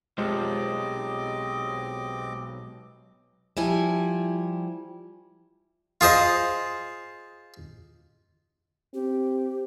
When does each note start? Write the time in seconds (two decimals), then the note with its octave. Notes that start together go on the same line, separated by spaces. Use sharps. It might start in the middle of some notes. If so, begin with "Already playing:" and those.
0.18 B1 G#3 C4 F4 G4 C5 D#5 D6
3.57 F3 G3 E4 G#5
6.01 F4 G#4 C5 D#5
8.94 C4 G4